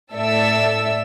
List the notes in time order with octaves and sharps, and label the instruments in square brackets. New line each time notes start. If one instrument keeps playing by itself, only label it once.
[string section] A2 A4 D5 E5 E6